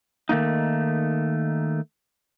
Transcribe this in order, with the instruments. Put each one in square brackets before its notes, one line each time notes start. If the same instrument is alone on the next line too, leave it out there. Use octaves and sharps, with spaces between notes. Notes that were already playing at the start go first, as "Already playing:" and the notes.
[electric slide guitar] D#3 A3 A#3 D#4